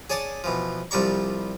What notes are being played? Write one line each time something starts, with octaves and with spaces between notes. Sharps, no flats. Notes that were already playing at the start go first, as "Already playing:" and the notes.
G#4 C#5 D5 A5 D6 D#6
B2 E3 F3
C2 F3 G3 D5 A#5 C#6